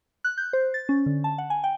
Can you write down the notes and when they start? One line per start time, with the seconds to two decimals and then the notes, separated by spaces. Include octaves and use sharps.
0.24 F#6
0.37 G6
0.53 C5
0.74 A6
0.89 C#4
1.06 D3
1.24 A5
1.38 F#5
1.50 G#5
1.64 G5